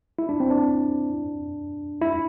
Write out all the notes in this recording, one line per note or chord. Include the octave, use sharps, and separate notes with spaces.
E4
D4
C4
D4
E4